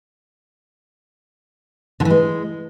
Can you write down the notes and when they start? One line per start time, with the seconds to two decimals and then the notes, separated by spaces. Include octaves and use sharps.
2.00 D3
2.05 E3
2.10 G#3